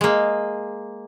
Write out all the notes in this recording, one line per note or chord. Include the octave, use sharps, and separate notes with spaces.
G#3 A#3